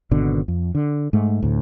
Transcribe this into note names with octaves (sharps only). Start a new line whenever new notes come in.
G#1 B2 D3
F2
D3
G#2 A3
D2 A2